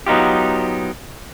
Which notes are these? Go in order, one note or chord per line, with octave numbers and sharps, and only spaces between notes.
F#3 B3 D#4 F4 G4